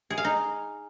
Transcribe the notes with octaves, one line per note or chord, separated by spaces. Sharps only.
G#4
F5
D#4